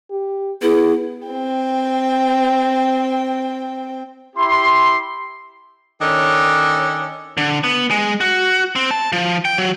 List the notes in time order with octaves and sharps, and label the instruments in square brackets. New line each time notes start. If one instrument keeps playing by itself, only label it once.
[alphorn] G4
[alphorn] B3 [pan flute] E4 [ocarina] G#4
[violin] C4 G5
[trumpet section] E4 G4 C6
[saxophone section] D#3 C#4 D4 A4 C#5
[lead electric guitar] D3
B3
G#3
F#4
C4
A5
F3
G5
F#3